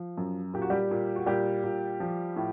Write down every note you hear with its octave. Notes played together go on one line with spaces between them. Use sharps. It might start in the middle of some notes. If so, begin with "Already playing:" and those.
Already playing: F3
F#2
A#2 G4
F#4
G3 G4
A#2
F#4
A#2 G3 G4
A#2
F3
A2